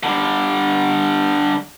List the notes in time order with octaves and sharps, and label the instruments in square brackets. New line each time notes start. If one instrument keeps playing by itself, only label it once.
[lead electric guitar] D3 G3